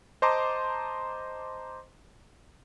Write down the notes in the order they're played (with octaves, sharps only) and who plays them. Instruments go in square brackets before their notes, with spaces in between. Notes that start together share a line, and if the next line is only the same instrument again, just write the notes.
[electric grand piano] C5 D#5 A5 A#5 C6 D6